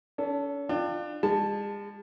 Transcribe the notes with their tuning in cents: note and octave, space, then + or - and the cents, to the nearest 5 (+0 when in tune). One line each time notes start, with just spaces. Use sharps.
C#4 +40 A4 +0
D4 +30 F4 +0 G5 +0
G#3 -40 A5 +0